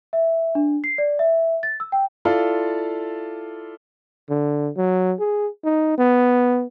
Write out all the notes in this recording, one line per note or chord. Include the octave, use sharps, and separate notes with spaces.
E5
D4
C7
D5
E5
A6
E6
G5
E4 F4 A4 D5 F5
D3
F#3
G#4
D#4
B3